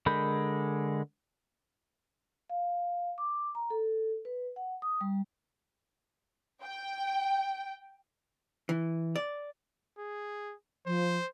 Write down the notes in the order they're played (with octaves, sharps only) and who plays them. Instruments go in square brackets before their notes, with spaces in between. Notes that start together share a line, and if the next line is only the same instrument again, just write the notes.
[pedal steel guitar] D3 G#3 A#4 B5 G6
[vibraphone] F5
D6
A#5
A4
B4
F#5
D#6
G3
[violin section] G5
[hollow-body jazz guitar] E3
D5
[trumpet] G#4
[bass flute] F3 [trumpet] C5